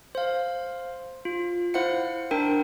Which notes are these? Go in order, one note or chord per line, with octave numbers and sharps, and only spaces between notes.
C5 F5
F4
E4 C5 F5 F#5 C#7
D4 A#4 G5